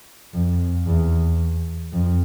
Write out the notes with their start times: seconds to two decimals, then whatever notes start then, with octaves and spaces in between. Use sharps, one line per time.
0.34 F2
0.86 E2
1.92 F2